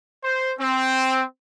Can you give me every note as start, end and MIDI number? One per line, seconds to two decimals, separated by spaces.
0.24 0.52 72
0.59 1.23 60